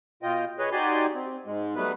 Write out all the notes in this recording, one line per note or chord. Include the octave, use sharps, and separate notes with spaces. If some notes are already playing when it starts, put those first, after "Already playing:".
B2 F4 D#5 G5
G#4 B4 C#5 D#5
D#4 F#4 G4 D5 G#5 C6
C4
G#2 G#3
F#3 G3 A3 B3 B4